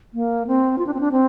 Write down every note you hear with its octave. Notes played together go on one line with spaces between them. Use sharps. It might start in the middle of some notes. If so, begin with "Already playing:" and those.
A#3
C4
F4
D4
C4
D4
C4